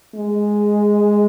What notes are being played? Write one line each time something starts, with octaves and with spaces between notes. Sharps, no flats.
G#3